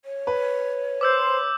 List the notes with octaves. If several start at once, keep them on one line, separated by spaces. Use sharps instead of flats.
C#5
B4
C5 D6 E6 G6